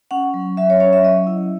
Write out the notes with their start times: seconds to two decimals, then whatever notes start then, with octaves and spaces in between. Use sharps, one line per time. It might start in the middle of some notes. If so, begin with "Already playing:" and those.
0.11 C#4 F#5
0.34 F#3
0.57 F#3 E5
0.70 C#5
0.80 C#4 C#5
0.93 E5
1.03 F#3 D#5
1.27 E4